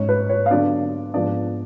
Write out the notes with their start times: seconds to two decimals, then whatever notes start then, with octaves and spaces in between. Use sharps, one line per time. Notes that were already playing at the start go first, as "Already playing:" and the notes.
Already playing: G#2 G#3 C#4 C#5
0.09 B4
0.29 C#5
0.46 F5
0.51 D3 F#3 B3 D4 D5
1.14 G#2 F3 B3 D4 D5